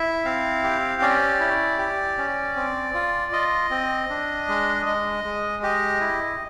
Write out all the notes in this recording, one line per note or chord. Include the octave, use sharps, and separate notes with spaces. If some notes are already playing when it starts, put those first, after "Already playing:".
Already playing: E4 E5
C4 F5
G4
C#4 D5
E4
G4
C#4
C4
F4
F4 D#5
C4
D4
G#3
G#3 D#5
G#3
G4 D#5
E4